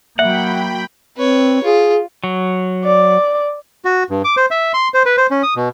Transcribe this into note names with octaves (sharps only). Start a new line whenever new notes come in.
F#3 A#3 E5 F#5 G5 B5
C4 B4 C#5
F4 G#4
F#3
D5
F#4
G2
D6
C5
E5
C6
C5
B4
C5
C#4
D#6
B2